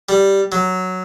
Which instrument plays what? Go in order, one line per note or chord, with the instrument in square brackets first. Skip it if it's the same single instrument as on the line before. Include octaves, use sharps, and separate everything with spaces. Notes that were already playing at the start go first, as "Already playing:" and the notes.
[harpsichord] G3
F#3